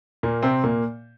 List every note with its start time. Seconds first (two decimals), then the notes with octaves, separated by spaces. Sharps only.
0.23 A#2 A#3
0.43 C3 C4
0.64 A#2 A#3